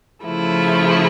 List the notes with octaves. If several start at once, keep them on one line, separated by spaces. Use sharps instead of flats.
C#3 F3 A3 E4